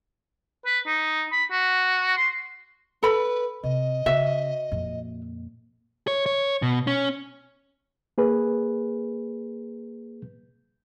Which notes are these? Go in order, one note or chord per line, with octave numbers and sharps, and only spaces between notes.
B4
D#4
B5
F#4
C6
A4 B4 B5
C3 D#5
C#3 F#4 E5
F2 A#2
C#5
C#5
B2
C#4
A#3 G#4 B4